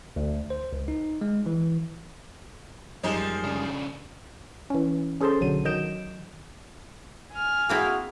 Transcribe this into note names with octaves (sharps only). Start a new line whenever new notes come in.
D2
C5
C#2
D#4
G#3
E3
F#2 F3 G3 G#3 C4 D#4
C#3 D4
E3 C#4
C#4 G#4 A4 C5 A5 C6
B1 D3 F#3 D#7
D#3 F#3 D#5 G6 D7 E7
G#5 F6
A#3 C4 E4 F#4 G#4